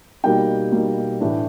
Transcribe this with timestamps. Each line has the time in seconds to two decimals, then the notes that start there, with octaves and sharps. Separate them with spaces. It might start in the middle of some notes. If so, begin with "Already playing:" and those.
0.24 B2 G3 A#3 D#4 G5
0.72 B2 G3 A#3 D#4
1.21 A2 E3 A3 D4